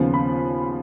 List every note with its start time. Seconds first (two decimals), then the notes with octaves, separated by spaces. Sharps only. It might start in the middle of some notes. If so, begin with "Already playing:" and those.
Already playing: D#2 C#3 F3 B3
0.14 B5